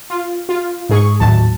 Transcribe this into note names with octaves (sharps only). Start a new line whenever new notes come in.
F4
F4
G#2 G#4 C#6
G#1 D#2 A2 F#3 A5